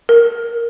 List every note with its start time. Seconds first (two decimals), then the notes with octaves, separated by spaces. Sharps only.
0.09 A#4